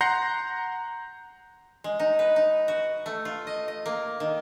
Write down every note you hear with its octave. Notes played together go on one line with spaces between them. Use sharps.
F#5 A#5 C6 G6 A#6 C7
G#3
D#4
B4
D#4
F#4
A3
F4
D#5
D#5
A#3
D#3